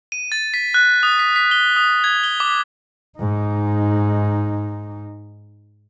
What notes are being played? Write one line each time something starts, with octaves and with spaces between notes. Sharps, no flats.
D#7
A6
B6
F#6
D#6
B6
B6
G7
D#6
G#6
G7
D6
G#2 D#4